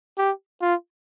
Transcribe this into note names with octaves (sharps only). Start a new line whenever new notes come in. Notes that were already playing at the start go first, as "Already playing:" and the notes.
G4
F4